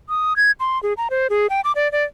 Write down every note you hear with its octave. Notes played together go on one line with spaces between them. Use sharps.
D#6
G#6
C6
G#4
A#5
C5
G#4
G5
D6
D5
D5